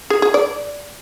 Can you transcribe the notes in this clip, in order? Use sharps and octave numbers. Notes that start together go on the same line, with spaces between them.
G#4
G#4
D5